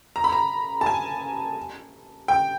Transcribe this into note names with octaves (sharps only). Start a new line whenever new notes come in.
A#5
B5
A#5
A5
G#5
G5